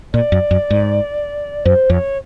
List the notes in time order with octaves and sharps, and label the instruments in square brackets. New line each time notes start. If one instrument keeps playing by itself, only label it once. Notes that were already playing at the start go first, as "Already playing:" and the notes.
[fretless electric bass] A#2 [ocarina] D5
[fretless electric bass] F#2
F#2
G#2
[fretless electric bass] F#2 [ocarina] C5
[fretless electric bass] F2 [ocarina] C#5